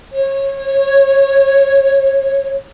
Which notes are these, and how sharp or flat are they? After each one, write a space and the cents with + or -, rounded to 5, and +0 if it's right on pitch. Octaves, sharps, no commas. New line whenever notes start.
C#5 -20